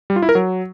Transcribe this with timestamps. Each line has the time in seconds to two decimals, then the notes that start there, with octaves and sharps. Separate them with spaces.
0.10 G3
0.16 F4
0.22 E4
0.29 A#4
0.35 F#3